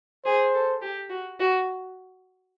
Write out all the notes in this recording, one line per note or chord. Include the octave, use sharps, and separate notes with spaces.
G#4 C5
A4
G4
F#4
F#4